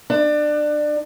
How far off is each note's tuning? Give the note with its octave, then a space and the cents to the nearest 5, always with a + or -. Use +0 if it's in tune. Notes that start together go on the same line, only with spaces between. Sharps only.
D4 +25